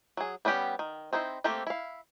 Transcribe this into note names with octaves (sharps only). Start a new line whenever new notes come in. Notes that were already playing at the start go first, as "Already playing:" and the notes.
F#3 G#4
G3 B3 C#4 G4 F#5
D#3
C4 D#4 E4 C5
A3 A#3 C4 G4 A4
E4 F5